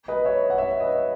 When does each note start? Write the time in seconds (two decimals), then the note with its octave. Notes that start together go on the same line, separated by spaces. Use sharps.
0.08 B4 D#5
0.25 C#5 E5
0.50 F#5
0.58 C#5 E5
0.80 B4 D#5